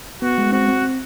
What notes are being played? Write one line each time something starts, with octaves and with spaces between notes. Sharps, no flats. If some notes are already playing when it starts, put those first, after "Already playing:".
B3 F#4
G#3
C4 F#4
C4